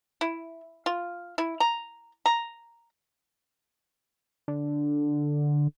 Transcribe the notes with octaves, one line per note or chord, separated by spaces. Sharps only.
E4
F4
E4
A#5
A#5
D3